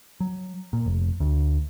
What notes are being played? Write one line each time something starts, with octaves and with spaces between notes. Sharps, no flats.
F#3
A#2
F1
D2